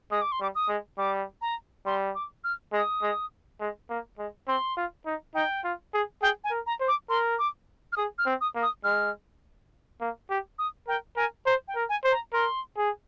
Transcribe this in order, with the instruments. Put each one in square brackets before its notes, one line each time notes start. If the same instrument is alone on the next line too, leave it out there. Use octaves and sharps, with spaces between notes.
[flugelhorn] G#3 [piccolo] D#6
[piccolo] D6
C6
[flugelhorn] G3 [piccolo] D6
[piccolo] D#6
[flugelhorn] G#3
[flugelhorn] G3 [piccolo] D6
[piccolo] A#5
[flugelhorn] G3 [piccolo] C6
[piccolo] D6
F6
[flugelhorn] G#3 [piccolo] D#6
[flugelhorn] G#3
G#3
A#3
G#3
[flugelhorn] C4 [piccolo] C6
[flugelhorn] F4
D#4
[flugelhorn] D#4 [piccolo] G5
[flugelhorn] F4
G#4
[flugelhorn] G#4 [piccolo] G5
[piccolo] G#5
[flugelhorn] A#4
[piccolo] A#5
[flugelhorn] C5
[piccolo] D6
[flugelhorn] A#4 [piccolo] C6
[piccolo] D6
F6
[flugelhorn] G#4 [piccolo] D#6
[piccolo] F6
[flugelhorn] C4
[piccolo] D#6
[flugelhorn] A#3
[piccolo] D#6
[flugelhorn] G#3 [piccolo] F6
[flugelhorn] A#3
G4
[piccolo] D#6
[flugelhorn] A#4 [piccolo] G5
[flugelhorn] A#4 [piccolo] G#5
[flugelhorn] C5 [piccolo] A#5
[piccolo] G5
[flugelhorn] A#4
[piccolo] G#5
[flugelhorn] C5
[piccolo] A#5
[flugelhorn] A#4 [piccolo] C6
[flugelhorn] G#4